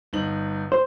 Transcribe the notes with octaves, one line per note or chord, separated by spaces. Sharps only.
G1 D#4 F#7
C5